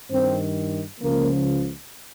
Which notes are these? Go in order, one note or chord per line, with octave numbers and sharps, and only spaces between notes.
G2 D#3 C4
C#2 C#3 F3 A#3